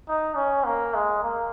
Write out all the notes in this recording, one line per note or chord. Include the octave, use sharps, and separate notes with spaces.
D#4
C#4
A#3
G#3
A#3